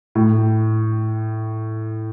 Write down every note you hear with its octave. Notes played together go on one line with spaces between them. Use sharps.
A2